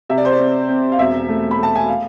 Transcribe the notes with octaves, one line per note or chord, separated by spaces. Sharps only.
C3 E5
D5
C5
D5
C4
C4
F5
E1 E5
A3
B5
A3 A5
G#5
F5